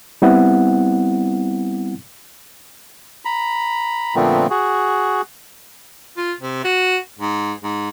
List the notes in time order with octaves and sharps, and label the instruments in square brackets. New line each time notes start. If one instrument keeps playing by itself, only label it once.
[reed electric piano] G3 B3 C4 E4 F#5
[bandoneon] A#5 B5
A#2 D3 F3 A3 B3 C4
F#4 G#4
[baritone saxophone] F4
C3
F#4
G#2
G#2